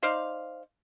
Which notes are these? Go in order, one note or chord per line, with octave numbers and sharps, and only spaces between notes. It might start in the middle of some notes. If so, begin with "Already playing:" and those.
D#4 C5 D5 F5